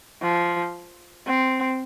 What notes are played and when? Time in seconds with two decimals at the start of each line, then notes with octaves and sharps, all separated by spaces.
0.22 F3
1.27 C4